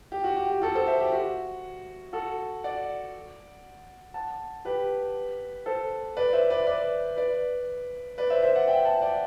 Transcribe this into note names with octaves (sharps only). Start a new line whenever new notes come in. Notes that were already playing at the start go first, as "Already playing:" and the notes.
G4
F#4
G4
G4
F#4 A4
A4 C5
C5 E5
G4
F#4
F#4 A4
D5 F#5
F#5 A5
G4 B4
A4 C5
B4 D5
C5 E5
B4 D5
B4 D5
B4 D5
B4 D5
C5 E5
C5 E5
D5 F#5
E5 G5
F#5 A5
D5 F#5